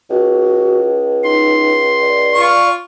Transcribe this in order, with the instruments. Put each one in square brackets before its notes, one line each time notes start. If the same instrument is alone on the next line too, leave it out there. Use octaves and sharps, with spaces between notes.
[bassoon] C#2 [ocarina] F#4
[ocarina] D#4 [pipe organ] C6
[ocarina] D5
[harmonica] F4 C#6